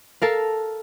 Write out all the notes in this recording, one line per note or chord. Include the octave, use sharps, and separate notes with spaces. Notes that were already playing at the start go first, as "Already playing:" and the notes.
A4 A#4 F5